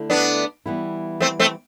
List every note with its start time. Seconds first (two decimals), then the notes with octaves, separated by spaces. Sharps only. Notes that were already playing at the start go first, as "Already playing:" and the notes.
Already playing: D3 A3 E4
0.10 B3 D4
0.66 E3 G3 B3 E4
1.20 A3 C4
1.40 A3 C4